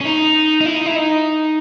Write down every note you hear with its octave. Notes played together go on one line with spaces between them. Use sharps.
C#4
D#4
D#4
E4
D#4
E4
D#4